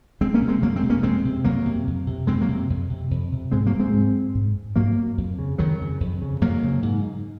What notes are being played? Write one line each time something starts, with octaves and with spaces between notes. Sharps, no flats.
F2 G#3 C4
A#3 C#4
C3
G#3 C4
F2 F#3 A#3
G#3 C4
C3
A#3 C#4
F2 G#3 C4
C3
F2 F#3 A#3
C3
F2
C3
F2 G#3 C4
F#3 A#3
C3
F2
C3
F2
C3
G#2 G#3 C4
F#3 A#3
G#3 C4
G#2
G#2
G#2 F#3 A#3
F2
C#3
F2 D#3 F#3
C#3
F2
C#3
F2 F#3 A#3
C#3
G#2